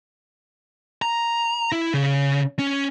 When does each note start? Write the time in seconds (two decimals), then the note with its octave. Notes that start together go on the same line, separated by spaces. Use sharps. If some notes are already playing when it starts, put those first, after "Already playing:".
1.02 A#5
1.72 E4
1.94 C#3
2.59 C#4